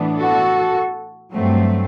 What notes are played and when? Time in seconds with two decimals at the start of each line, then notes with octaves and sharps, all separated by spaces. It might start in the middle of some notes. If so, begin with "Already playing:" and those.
Already playing: A2 E3 B3 D4
0.19 F#4 A4
1.33 G2 F#3 A3 C4